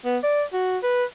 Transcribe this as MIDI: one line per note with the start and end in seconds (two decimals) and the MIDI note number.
0.05 0.18 59
0.23 0.43 74
0.53 0.78 66
0.83 1.04 71